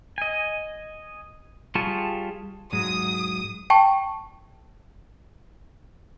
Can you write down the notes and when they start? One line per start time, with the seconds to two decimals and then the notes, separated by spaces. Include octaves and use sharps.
0.18 D#5 G#5
1.75 G3 F4 G#4 A5 C#6
2.73 G#2 F#3 G#3 D#6
3.70 G5 A5 C#6